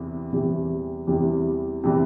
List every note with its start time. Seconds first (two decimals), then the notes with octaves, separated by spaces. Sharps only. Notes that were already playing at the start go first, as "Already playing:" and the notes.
Already playing: E2 C3 E3
0.32 E2 C3 E3 G3
1.07 E2 C3 E3 G3
1.84 C3 E3 G3